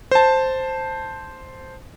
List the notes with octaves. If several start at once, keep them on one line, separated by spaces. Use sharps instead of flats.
C5 A5